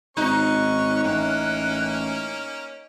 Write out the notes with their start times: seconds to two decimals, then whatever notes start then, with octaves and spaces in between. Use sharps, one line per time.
0.17 G#1 C#4 D#4 C#6 F#6
1.04 A1 A#3 C#4